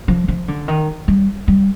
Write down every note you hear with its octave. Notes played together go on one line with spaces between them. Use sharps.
F3
F3
D3
D#3
G3
G3